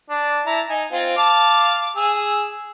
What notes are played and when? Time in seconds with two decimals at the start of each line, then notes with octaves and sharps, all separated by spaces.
0.10 D4
0.46 E4 A5 A#5
0.69 D#4 G#5
0.92 C4 F4
1.18 F5 A5 D6
1.96 G#4 E6